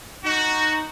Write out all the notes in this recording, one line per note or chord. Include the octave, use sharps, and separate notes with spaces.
D#4 F#4